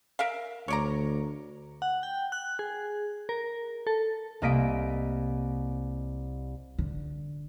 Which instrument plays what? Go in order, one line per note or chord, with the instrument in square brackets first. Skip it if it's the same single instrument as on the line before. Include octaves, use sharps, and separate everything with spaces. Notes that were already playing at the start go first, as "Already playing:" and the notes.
[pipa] A#4 E5 F5
[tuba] D2 [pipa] C#5 D5 A#5
[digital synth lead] F#5
G5
F#6
G#4
A#4
A4
[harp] C2 A#3 D#5 B6 D7
[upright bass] D3